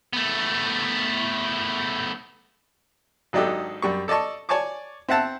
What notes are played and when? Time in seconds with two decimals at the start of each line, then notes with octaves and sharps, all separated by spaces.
0.13 A3 B3
3.33 G#1 F#3 D4 D#4 G4 A4
3.82 F#2 G3 C#6
4.08 A4 D5 D#5 A5 C#6
4.49 C#5 D5 G#5 A5 C#6 D6
5.09 C4 E5 F#5 A5